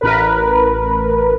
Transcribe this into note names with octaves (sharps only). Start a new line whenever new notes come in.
A1 A#4 B4